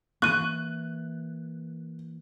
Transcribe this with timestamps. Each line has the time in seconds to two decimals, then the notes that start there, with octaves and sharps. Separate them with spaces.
0.22 E3 A#3 C#6 F#6 D#7